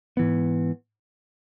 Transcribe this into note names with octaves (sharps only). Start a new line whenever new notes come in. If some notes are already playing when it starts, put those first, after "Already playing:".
G#2 E3 B3